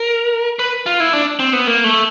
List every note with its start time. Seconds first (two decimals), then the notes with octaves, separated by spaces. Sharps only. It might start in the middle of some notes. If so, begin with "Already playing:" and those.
Already playing: A#4
0.59 B4
0.86 F4
1.00 E4
1.13 D4
1.39 C4
1.53 B3
1.67 A#3
1.84 A3